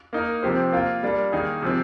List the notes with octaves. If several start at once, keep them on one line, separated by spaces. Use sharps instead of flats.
A#3 D#4 A#4
C3 F3 C4 G4 C5
A#3 F4 A#4
G3 A#3 D4
D#3 A#3 D#4 G#4
C3 F3 C4